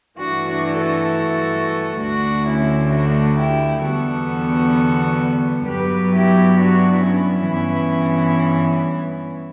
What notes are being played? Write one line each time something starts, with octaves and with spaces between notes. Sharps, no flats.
G2 E3 A3 D4 F#4
D4 F#4
F#4 A4
D2 D3 A3 D4 F#4
C#4 E4
D4 F#4
E4 G4
E2 D3 G3 B3 F#4 A4
G2 F#3 B3 G4 B4
E4 G4
D4 F#4
C#4 E4
G2 E3 B3